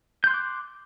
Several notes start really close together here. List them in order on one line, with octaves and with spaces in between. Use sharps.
G6 C6 F#6 D6